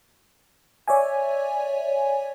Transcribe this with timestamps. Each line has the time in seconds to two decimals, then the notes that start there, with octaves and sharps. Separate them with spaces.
0.88 C#5 D5 E5 G#5